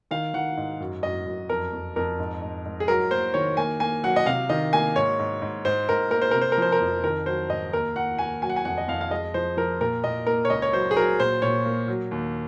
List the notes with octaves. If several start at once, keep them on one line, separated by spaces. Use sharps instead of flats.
D#3 F5
D#3 F#5
G#2
F#2
F#2 D#5
F#2
F2 A#4
F2
F2 A#4
G#2
G#2
G#2
G#4
F#3 A#4
A#3 C5
D#3 C#5
A#3 G#5
A#3 G#5
F#3 F#5
D#5
C3 F5
D#3 D#5
A#3 G#5
G#2 C#5
G#2
G#2
G#2 C5
G#2 A#4
A#3 A#4
C5
C3 A#4
C5
A#4
F3 C5
A#4
F2
D#3 A#4
F#3 C5
G#2 D#5
D#2 A#4
D#2 F#5
D#2 G#5
F#3 G#5
F#5
G#5
F2 F#5
D#5
F2 F5
F5
G#3 D#5
F3 C5
F3 A#4
A#2 A#4
A#2 D#5
A#3 A#4
C#5
C#2 D#5
C#5
F#3 C5
G#4
F#3 A#4
A#2 C5
A#2 C#5
A#3
F#3
D#2